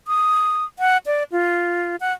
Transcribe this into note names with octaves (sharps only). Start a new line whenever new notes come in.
D#6
F#5
D5
F4
F#5